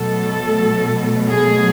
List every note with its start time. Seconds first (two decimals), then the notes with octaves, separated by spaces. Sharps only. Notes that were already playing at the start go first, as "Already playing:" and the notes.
Already playing: B2 F#3 A3 A4
1.30 G#4